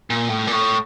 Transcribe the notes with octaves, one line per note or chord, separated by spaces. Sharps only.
A#2
A2
A#2
A2